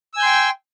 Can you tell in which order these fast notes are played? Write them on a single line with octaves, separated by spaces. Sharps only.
E6 G#5 G6 C6 G5